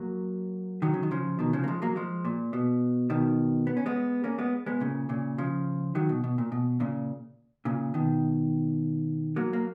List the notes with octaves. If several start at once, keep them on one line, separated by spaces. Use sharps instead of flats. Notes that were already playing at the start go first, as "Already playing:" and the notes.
Already playing: F#3 A#3
D#3 F#3
C#3
D#3
C#3 F3
B2 D#3
C#3 F3
A#3
F3 G#3
F#3 A#3
F3 G#3
A#2
B2
B2 D#3
B3
C#4
G#3 B3
A#3 C#4
G#3 B3
G#3 B3
A#2 C#3
A#2 C#3
C#3 F3
D#3 F#3
B2
B2
A#2
B2
A#2 C#3
A#2 C#3
B2 D#3
F#3 A#3
A#3